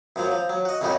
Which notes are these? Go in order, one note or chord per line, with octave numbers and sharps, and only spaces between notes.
F#2 F3 F#3
F3
F#3
F#4 D#5
C2 F2 G3 C#4 D#4 F#4